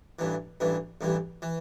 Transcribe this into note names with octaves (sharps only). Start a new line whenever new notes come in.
A1 G2 E3
A1 G2 E3
A1 G2 E3
E3